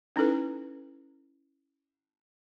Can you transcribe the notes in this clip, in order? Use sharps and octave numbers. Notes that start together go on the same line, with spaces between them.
C#4 D#4 E4 A4 B4